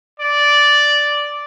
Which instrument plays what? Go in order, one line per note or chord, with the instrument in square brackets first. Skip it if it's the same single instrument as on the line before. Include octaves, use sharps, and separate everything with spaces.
[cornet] D5